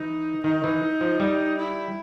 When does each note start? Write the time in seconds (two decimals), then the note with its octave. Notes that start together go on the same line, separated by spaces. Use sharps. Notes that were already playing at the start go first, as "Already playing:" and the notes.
Already playing: E3 D#4
0.44 D#3 D#4
0.64 E3
1.01 F3
1.20 G3
1.58 E4